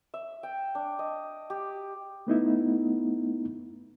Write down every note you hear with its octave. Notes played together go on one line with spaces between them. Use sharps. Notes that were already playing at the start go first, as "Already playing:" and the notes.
E5
G5
D4
D#5
G4
A3 B3 D#4 E4